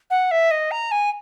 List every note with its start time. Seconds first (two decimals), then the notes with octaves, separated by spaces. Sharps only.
0.10 F#5
0.31 E5
0.51 D#5
0.71 A#5
0.91 G#5